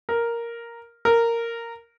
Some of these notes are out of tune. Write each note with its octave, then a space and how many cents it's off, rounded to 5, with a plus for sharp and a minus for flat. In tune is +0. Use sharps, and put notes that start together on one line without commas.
A#4 +0
A#4 -10